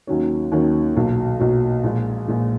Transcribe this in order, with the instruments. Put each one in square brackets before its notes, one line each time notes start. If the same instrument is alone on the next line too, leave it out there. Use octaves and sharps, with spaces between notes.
[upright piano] D#2 D#3 F#3 C#4
D#2 D#3 F#3 C#4
B1 A#2 F#3
B1 A#2 F#3
A#1 A#2 G#3
A#1 A#2 G#3